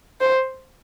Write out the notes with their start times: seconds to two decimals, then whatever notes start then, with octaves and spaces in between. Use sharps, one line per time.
0.21 C5